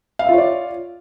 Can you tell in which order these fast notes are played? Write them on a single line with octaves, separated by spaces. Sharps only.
F5 E5 F4 C#5 D5